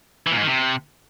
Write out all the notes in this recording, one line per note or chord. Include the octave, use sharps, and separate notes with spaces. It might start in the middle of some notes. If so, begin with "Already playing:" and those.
E3
A#2
G#2
D#3
C3